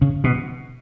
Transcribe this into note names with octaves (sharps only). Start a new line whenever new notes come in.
C#3
B2